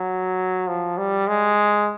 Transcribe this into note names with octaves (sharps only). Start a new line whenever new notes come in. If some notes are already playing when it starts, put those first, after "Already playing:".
Already playing: F#3
F3
G3
G#3